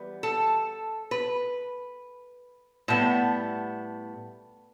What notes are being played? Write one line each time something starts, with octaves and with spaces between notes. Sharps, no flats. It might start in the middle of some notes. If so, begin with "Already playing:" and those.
Already playing: E3 G3 B3
A4
B4
A2 G3 B3 A5